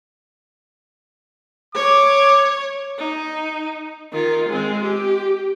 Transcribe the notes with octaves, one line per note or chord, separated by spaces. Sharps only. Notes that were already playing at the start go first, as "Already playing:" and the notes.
C#5 D6
D#4
D#3 F4
G#3 C4
G4